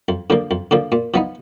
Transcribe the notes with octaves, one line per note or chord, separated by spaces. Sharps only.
F2
D3 F3 A#3
F2
D3 F3 A#3
A#2
F3 B3 D#4